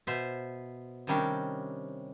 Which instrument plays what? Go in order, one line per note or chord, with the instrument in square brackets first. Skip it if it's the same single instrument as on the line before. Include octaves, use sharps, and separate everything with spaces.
[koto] B2 C5 E5
C3 D#3 G3 C#4 D4